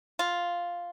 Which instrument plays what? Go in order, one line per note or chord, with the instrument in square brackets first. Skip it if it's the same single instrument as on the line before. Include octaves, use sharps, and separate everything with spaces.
[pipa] F4